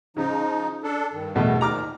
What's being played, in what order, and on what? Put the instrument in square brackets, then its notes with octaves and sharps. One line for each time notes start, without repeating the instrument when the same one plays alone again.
[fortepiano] C#3 [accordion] F3 D#4
[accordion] D4 A4
G2 D#3
[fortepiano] E2 B2 A3
[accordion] A#2 D#3 F3 [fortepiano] A#5 D6 F6